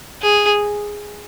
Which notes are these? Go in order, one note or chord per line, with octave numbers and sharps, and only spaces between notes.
G#4